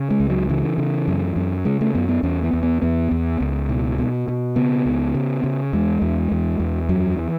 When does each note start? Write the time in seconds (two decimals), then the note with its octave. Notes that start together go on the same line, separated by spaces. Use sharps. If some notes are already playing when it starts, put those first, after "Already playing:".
Already playing: C#3
0.10 G#3
0.20 C#2
0.30 F#3
0.49 C#3 E3
0.78 C#3
1.08 F#2
1.36 F#2
1.65 C#3 G#3
1.81 A3
1.94 F#2 B3
2.09 B3
2.23 E2 C#4
2.43 B3
2.53 E2
2.63 B3
2.82 E2 B3
3.11 E2
3.41 C#2
3.69 B2
3.98 B2
4.28 B2
4.56 C#3 B3
4.86 C#2
5.14 C#3
5.44 C#3
5.73 E2 G#3
6.02 E2
6.32 E2
6.60 E2
6.89 F#2 F#3
7.19 E3